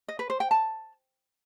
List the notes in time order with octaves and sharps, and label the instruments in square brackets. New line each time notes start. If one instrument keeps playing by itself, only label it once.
[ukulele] D#5
B4
C5
G5
A5